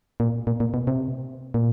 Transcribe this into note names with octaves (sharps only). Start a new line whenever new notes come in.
A#2
A#2
A#2
B2
C3
A#2